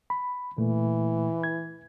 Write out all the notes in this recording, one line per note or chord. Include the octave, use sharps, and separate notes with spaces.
B5
A#2 E3 A3
G#6